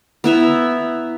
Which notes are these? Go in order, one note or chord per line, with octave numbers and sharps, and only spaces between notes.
B3 E4 E5 A#5